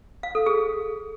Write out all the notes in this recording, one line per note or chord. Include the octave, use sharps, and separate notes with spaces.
F5
A4
G#4